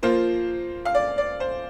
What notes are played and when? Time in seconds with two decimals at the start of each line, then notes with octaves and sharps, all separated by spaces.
0.03 F3 A#3 F4 C5
0.85 F5
0.95 D5
1.18 D5
1.40 C5